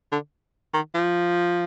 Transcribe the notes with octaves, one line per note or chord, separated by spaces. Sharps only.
D3
D#3
F3